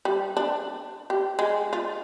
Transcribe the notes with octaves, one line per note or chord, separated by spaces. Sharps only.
G3
D4
G4
G#3
F4